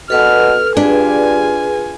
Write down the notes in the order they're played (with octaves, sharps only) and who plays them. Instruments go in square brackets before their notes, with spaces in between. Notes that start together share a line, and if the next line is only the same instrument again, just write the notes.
[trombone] B2 [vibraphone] A4 B4 [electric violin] F6
[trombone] G2 [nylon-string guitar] D4 [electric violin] F4 G#5 [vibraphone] G#4 B4